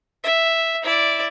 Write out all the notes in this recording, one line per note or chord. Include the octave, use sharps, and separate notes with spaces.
E5
E4 D5